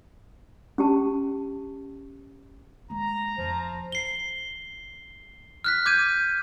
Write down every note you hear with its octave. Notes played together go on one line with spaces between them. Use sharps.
C#4 G4 A5
G#3 A#3 A#5
F2 F3
C7 G7
F6 F#6 B6
D6 G6 G#6 D#7